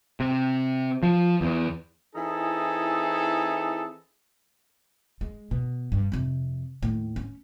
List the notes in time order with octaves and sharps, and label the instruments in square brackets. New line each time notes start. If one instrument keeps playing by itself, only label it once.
[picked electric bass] C3
F3
E2
[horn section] E3 C4 D#4 E4 G#4 A4
[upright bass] G#3
B2
G2
F2 C3
D#2 A2
C#4